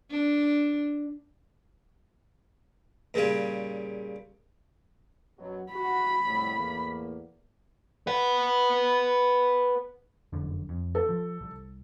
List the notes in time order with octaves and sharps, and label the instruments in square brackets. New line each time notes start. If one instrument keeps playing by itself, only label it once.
[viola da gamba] D4
[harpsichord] A#2 C#3 G3 G#4
[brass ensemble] F#2 B2 F#3
[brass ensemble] F#4 [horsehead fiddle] B5
[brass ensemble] C2 F2 A2
E2 A2 A#3
[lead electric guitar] B4 F#5
[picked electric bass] F1 F#2 D3
F2
[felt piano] A4
[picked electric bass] F3
C2